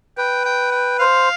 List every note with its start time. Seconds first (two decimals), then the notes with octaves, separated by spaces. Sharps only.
0.18 B4 G5
0.45 G5
0.72 G5
0.99 C5 F5